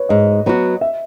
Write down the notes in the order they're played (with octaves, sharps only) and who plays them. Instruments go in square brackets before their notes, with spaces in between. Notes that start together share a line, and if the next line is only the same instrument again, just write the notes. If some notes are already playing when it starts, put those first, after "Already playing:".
Already playing: [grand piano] B4 C#5
[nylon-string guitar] G#2 [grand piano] D#5
[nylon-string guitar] F#3 B3 F#4
[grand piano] E5